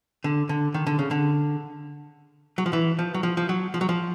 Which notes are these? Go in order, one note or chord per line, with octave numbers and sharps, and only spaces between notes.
D3
D3
D#3
D3
C#3
D3
F#3
F3
E3
F3
F#3
F3
F3
F#3
F3
F#3
F3